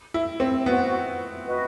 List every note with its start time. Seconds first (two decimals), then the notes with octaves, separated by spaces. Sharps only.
0.14 E4
0.40 C4
0.66 B3 F#4 C5 F#5
1.45 F#4 B4 D#5